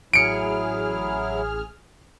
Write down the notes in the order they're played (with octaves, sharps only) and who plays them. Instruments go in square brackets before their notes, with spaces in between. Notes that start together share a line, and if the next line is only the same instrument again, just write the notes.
[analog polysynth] A1 G#4 F6 [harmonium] F#3 E4 [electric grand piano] C#7 D7